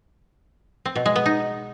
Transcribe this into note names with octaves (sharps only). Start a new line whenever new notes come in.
C4
B2
G#3
B3
D#4